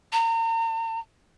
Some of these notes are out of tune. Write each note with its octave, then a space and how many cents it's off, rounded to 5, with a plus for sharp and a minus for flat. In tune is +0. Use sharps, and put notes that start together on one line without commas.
A#5 -40